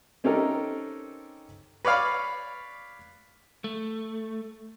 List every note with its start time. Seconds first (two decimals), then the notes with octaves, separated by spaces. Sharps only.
0.24 C4 C#4 D#4 G4 A4 A#4
1.85 B4 C#5 D5 F5 B5
3.64 A3